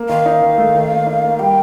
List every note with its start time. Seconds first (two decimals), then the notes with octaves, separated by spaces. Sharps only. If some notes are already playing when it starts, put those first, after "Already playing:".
Already playing: A#3
0.09 D#3 F5
0.26 D#4
0.42 D#3
0.58 A3
0.75 D#3
0.91 A#3
1.06 D#4
1.24 A#3
1.39 G3 G5